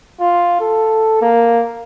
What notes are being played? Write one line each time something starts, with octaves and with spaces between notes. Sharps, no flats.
F4
A4
A#3